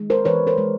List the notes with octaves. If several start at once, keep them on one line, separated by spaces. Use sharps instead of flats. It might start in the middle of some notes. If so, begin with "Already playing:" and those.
Already playing: D#3 G#3
A#4 C5
E3 B4 C#5
A#4 C5
G#3